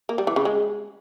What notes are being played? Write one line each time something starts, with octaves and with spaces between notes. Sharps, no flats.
A#3
G3
E3
C#3
G#3